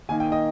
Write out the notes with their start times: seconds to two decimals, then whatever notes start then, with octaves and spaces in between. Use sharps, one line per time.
0.09 D#3 A#3 D#4 G#5
0.20 G5
0.32 D#5